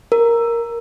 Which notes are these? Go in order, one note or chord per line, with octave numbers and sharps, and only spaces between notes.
A#4